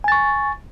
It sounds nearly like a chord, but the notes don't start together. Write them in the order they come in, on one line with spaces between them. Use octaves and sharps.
G#5 A6 C#6